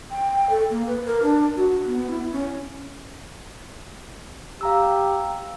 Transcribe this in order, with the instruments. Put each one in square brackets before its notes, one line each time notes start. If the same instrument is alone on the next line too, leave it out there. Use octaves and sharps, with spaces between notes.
[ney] G5
A4
A#3
B4
A#4
D4
F#4
B3
E4
C#4
[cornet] G4 [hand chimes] F5 A#5 E6